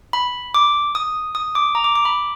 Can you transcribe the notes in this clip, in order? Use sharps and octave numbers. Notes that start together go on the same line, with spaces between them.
B5
D6
D#6
D#6
D6
A#5
D6
D6
B5